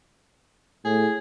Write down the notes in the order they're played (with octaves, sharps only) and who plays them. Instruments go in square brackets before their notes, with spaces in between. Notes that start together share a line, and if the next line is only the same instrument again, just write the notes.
[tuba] A2 [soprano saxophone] G#4